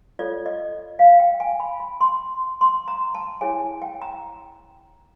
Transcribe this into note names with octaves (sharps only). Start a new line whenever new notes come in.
F4 A4 C#5 D5
D#5
F5
G5
G#5
B5
B5
C6
C6
A#5
A5
E4 G#4 C#5 G#5
G5
A#5